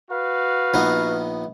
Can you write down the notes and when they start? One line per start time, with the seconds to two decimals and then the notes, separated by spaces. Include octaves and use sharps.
0.10 F#4 B4 F5
0.74 A#1 B3 D#4